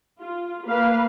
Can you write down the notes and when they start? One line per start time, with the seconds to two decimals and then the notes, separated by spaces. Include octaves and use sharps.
0.20 F4
0.68 A#3 B4 F5